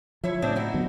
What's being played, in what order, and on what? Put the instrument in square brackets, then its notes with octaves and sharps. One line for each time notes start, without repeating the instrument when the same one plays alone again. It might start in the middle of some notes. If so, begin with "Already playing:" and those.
[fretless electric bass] F3 [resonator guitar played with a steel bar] E4 C#5 E5
[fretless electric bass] A2 [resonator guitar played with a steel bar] C#3 C4 D4
[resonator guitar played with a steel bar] D#4 E4 F#4
[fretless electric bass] D3 F#3 B3